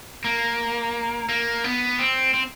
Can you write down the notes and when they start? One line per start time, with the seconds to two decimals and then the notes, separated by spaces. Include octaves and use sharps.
0.24 A#3
1.29 A#3
1.64 B3
1.99 C4
2.34 C4